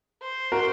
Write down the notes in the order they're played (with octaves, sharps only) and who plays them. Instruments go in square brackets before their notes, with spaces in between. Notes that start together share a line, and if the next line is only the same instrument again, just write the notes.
[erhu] C5
[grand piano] F#4 A#4